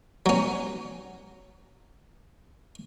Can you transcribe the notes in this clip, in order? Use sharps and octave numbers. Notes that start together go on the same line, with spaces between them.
F#3 C#4